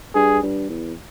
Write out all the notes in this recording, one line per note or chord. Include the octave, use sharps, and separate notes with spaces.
G2 G#4
G2
E2